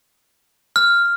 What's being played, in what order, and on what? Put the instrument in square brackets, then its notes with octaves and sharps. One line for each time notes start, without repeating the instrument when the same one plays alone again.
[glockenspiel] F6